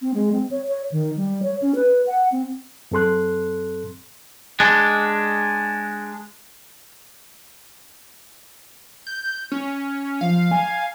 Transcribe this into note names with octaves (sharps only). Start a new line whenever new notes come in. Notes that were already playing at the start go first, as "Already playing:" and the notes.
C4
G#3
C4
C#5
C#5
D#3
G3
C#5
C#4
B4
F#5
C4
F#2 C4 A4 C6 F#6
G#3 D4
G6
C#4
F3 F5
G#5